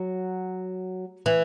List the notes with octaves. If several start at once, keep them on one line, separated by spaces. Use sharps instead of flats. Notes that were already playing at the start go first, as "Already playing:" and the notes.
Already playing: F#3
E3